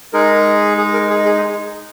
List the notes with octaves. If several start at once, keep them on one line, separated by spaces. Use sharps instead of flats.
G#3 D#4 G#4 A#4
G#4
A#4
G#4
G#4